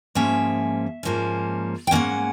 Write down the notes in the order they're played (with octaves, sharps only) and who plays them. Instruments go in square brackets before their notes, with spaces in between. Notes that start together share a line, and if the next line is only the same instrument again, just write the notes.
[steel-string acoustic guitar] G#2 F3 A#3 C#4 E5
G#2 F3 A#3 C#4
G5
G#2 F3 A#3 C#4 F#5